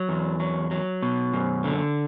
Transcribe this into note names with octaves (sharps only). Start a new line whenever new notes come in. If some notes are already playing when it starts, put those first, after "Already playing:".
Already playing: F#3
E2
F#3
F#3
B2
F#2
D3